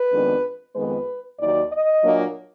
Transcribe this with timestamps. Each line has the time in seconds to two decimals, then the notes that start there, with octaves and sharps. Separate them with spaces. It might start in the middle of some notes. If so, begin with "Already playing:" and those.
Already playing: B4
0.11 F2 D#3 G#3 B3 D4
0.75 F2 D#3 G#3 B3 B4
1.39 D#2 D#3 F#3 D5
1.71 D#5
2.03 A#2 F#3 A#3 D4